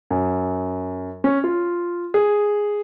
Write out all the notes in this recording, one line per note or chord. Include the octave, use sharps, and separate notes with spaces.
F#2
C#4
F4
G#4